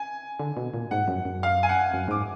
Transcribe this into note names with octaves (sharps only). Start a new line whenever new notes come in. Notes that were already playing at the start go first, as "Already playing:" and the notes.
Already playing: G#5
D3
B2
A#2
G#2 F#5
F#2
F#2
F5
G#5
F#5
F#2
G#2 D6